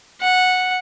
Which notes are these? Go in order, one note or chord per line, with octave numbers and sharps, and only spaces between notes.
F#5